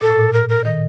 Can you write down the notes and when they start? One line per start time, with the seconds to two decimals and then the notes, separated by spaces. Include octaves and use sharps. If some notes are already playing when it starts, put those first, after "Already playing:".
0.01 A#2 A4
0.10 A2
0.19 A#2
0.33 A#4
0.49 A#4
0.64 D#3 D#5